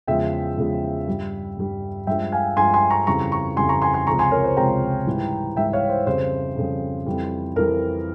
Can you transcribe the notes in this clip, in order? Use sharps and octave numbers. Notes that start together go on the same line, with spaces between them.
E2 C#3 F3 G#3 E5 G5
E2 C#3 F3 G#3
G2 G3
G2 G3
G2 F3 G#3 E5 G5
F5 G#5
G2 F3 G#3 G#5 C6
G#5 C6
A#5 C#6
F2 C#3 E3 G3 A#5 C#6
A#5 C#6
F2 C#3 E3 G3 G#5 C6
A#5 C#6
G#5 C6
G#5 C6
C#2 C3 F3 G#3 A#5 C#6
G#5 C6
A#4 C#5
C5
C#2 C3 F3 G#3 G5 A#5
G#2 E3 G3
G#2 E3 G3 E5 G5
C#5 F5
C5
F2 C#3 G3 C5
F2 C#3 G3
F2 E3 G3
F2 E3 G3 A#4